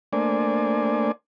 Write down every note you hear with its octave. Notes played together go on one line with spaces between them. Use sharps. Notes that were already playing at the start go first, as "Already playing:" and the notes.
A3 A#3 D4 C5 D5 G#5